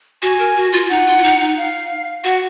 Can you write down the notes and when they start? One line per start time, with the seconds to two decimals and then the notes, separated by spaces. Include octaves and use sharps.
0.22 F#4 G#5
0.39 A#4
0.56 F#4
0.73 F4
0.90 D#4 F#5
1.06 F4
1.18 F4
1.24 D#4
1.41 D#4
1.57 F5
2.24 F#4 F#5